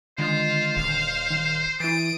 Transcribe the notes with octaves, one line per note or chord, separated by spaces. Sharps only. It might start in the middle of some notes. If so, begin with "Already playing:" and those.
D3 D#3 G#3 F4 C5
D#1 F5
D#3
E3 E4 D#6 A6 D7